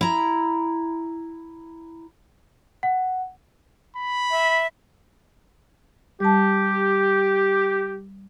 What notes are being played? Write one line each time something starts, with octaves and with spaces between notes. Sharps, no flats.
E4 A#5
F#5
B5
E5
G3 G4 A5